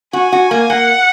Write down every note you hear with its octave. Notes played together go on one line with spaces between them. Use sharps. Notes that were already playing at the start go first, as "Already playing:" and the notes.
F#4 G#5
F#4
A#3
A#3 F#5